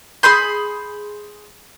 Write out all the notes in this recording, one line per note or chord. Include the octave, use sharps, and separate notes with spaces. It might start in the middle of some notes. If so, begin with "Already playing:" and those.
G#4 B5 C6 G6